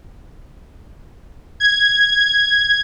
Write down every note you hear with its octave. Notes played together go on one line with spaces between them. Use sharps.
G#6